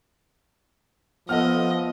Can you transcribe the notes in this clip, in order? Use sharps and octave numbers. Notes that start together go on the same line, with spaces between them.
F3 B3 A4 D#5 F#5 F6